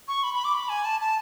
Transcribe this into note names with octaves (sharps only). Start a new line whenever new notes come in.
C#6
B5
B5
D6
B5
G#5
A5
A5